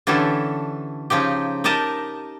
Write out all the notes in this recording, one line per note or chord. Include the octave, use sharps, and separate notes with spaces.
D3 E3 C#4 G4 A4
C#3 F3 D#4 G4
D#4 G4 A#4 D#5 A5